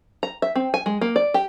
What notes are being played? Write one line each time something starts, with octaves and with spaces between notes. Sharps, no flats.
A#5
E5
C4
G#5
G#3
A#3
D5
G4